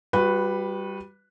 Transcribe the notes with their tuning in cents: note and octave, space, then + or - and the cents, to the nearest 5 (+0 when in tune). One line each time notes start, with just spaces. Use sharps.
G3 +0 F#4 -40 B4 +0